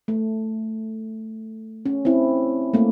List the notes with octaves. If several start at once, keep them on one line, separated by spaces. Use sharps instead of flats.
A3
C#4
C4 E4
A3 A#3